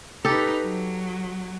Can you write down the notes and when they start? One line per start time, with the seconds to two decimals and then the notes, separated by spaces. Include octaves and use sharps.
0.25 D#4 G4 A4 B4
0.62 F#3